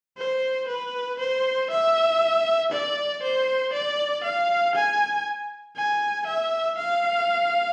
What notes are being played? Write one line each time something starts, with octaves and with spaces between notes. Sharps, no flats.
C5
B4
C5
E5
D5
C5
D5
F5
G#5
G#5
E5
F5